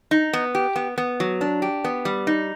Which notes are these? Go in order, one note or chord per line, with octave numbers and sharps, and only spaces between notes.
D#4
B3
G4
B3
B3
F#3
D4
G4
B3
G3
D#4